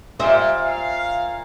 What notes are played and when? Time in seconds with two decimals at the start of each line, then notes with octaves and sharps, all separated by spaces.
0.20 A#2 G3 G4 C5 E5
0.64 F5